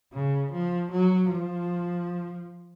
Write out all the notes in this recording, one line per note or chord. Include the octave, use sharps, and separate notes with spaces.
C#3
F3
F#3
F3